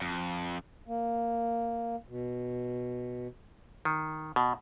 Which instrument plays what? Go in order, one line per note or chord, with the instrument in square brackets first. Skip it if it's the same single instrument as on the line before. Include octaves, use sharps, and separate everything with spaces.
[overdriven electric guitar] F2
[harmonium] A#3
B2
[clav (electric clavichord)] D#3
B2